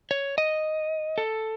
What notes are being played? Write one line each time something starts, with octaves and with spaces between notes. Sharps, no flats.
C#5
D#5
A4